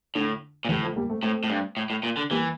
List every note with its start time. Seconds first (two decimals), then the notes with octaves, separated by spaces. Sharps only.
0.15 A2 D3
0.65 A#2
0.69 A2 E3 G3
0.83 F3 A3
0.96 G3 A#3
1.10 A3 C4
1.23 A2 A3 C4
1.44 A2
1.50 G2
1.77 A2
1.90 A2
2.03 A#2
2.17 D3
2.30 E3 G3 A#3